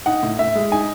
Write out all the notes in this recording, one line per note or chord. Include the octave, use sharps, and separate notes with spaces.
D#4 F#5
A2
A2 E5
G#3
D#4 G#5